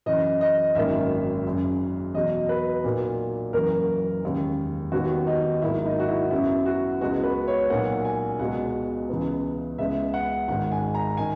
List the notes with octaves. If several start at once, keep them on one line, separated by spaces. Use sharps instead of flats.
F#2 C#3 E3 D#5
D#5
G#1 F#2 D#3 A#3 E5
F#1 F#2 C#3
E2 B2 F#3 D#5
B4
B1 A#2 F#3 A#3
F#1 F#2 E3 A#3 A#4
E1 D#2 C#3
D#2 D#3 F#3 B3 F#4
D#4
G#1 G#2 F#3 A#3 E4
D#4
F#4
E4
F#2 C#3 F#3 B3 E4
F#4
C#2 C#3 G#3 B3 F#4
B4
C#5
B1 A#2 A#3 F#5
G#5
C#2 B2 G#3 F#5
C#2 C#3 E3 B3
C#2 C#3 G#3 B3 E5
F#5
G#1 G#2 D#3 F#5
G#5
A#5
D#3 G#5